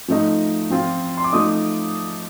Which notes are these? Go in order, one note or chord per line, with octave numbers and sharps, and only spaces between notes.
F3 A3 D#4
F3 C4 F4
C6
D6
F3 A3 D#4 D#6